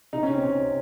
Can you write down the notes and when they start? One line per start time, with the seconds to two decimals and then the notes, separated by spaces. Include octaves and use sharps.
0.13 C3 D#4
0.23 C#4
0.28 C3 C4
0.43 C3 C#4
0.59 C3